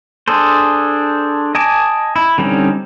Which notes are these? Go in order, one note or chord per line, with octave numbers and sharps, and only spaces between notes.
D4 G#4 A4 C5
D#5 G#5 A5 D6
E4
D3 G3 C4 C#4 D#4